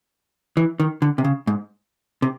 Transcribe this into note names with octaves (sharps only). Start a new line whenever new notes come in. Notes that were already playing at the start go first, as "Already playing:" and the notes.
E3
D#3
D3
C3
C#3
G#2
C3